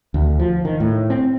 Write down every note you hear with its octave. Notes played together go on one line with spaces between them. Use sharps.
D2
F3
D#3
A2
C4